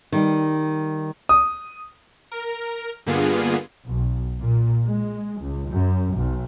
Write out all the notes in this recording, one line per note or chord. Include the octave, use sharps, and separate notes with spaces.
D#3 G3 D#4
D#6
A#4
G2 D3 A#3 B3 F4 G#4
B1
A#2
G#3
C#2
F#2
B1